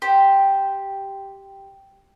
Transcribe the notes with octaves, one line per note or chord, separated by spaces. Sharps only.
G4 C5